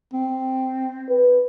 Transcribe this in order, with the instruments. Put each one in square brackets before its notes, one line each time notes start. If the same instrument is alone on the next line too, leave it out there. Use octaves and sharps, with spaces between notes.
[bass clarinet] C4
[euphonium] B4